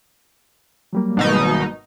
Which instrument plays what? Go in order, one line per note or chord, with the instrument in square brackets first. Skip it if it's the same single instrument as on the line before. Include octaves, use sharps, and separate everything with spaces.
[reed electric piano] F#3 G3 A#3
[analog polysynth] G#1 B2 D#4